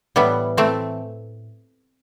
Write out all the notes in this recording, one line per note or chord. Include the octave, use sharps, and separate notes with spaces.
A2 E3 G3 B3
E3 A3 C4